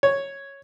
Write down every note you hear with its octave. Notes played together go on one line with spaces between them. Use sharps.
C#5